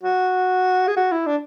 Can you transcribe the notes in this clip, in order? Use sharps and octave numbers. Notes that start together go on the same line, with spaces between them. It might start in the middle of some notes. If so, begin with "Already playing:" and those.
F#4
G#4
F#4
E4
D4